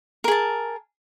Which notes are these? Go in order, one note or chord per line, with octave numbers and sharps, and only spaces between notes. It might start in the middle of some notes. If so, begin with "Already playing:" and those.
G#4 A#4 A5